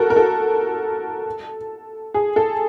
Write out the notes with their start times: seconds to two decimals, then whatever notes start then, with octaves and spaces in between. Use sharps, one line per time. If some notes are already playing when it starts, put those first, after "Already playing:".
Already playing: F#4 A4 A#4
0.10 A#4
0.16 A4
2.14 G#4
2.36 A4